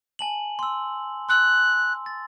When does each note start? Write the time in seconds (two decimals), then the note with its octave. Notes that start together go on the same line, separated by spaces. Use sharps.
0.19 G#5 A5 F#7
0.59 C6 E6
1.29 C6 E6 F#6
2.06 A6